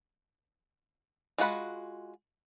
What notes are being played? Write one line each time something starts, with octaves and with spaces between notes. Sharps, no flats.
G#3 F4 F#4 F#5 B5